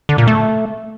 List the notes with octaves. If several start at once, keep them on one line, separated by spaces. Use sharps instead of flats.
D3
A#2
A3